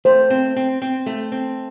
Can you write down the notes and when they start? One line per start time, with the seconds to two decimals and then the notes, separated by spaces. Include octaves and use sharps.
0.05 A3 C5
0.30 C4
0.57 C4
0.82 C4
1.06 A3
1.32 C4